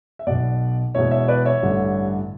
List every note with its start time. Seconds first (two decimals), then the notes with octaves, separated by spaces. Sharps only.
0.19 E5
0.27 B1 B2 D5 F#5
0.95 E1 E2 B2 C#5 E5
1.11 C#5 E5
1.28 B4 D5
1.45 C#5 E5
1.63 A1 G2 D3